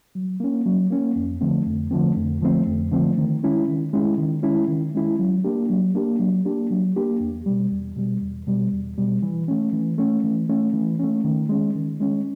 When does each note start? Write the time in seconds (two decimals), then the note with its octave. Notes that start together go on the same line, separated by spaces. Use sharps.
0.15 F#3
0.40 A#3 C#4
0.66 F#3
0.90 A#3 C#4
1.16 F2
1.41 D3 F3 A3 C4
1.66 F2
1.91 D3 F3 A3 C4
2.17 F2
2.41 D3 F3 A3 C4
2.67 F2
2.92 D3 F3 A3 C4
3.18 D#3
3.43 G#3 C#4 E4
3.68 D#3
3.93 G#3 C#4 E4
4.18 D#3
4.43 G#3 C#4 E4
4.68 D#3
4.95 G#3 C#4 E4
5.19 F#3
5.44 A#3 D4 G4
5.70 F#3
5.95 A#3 D4 G4
6.20 F#3
6.45 A#3 D4 G4
6.71 F#3
6.96 A#3 D4 G4
7.20 E2
7.46 B2 G3
7.71 E2
7.96 B2 G3
8.21 E2
8.47 B2 G3
8.72 E2
8.98 B2 G3
9.23 E3
9.48 A3 C#4
9.73 E3
9.98 A3 C#4
10.24 E3
10.49 A3 C#4
10.74 E3
10.99 A3 C#4
11.24 D#3
11.49 G#3 C#4
11.75 D#3
12.00 G#3 C#4